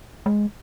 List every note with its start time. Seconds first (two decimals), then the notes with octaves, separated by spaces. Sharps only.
0.26 G#3